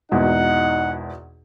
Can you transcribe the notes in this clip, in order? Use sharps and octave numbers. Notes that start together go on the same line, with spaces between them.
G#1 E2 B2 D#4 F#5